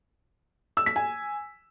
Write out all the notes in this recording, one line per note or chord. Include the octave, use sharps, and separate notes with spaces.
E6
B6
G#5